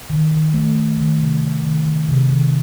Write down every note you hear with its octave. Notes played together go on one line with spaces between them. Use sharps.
D#3
D#3
A3
A3
D#3
C3
D#3
D#3
D#3
C3
D#3